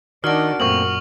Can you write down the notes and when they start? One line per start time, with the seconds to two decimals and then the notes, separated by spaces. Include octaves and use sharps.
0.24 D#3 D4 D#4 F#4 A#4 D5 F#5 F6
0.60 F#2 A#2 A3 A#3 C4 C#6 D#6 F#7